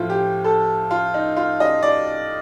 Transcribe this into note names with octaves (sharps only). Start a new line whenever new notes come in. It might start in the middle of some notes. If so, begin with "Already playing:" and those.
Already playing: A2 F3 F4
G4
A4
F4
D#4
F4
D#5
D5